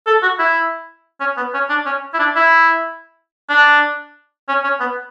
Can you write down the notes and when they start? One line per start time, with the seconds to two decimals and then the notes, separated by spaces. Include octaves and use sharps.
0.07 A4
0.23 F#4
0.39 E4
1.20 C#4
1.37 B3
1.54 C#4
1.69 D4
1.86 C#4
2.14 E4
2.19 D4
2.36 E4
3.50 D4
4.49 C#4
4.64 C#4
4.80 B3